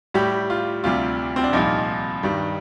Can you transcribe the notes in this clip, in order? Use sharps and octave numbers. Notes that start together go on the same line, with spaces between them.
A2 G3 G4
F4
D2 C3 G3 F4
C4
D4
C2 A#2 F3 D#4
G2 D#3 G3